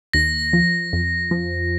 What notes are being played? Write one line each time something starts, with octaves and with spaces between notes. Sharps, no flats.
D#2 A#6
F3
F2
F3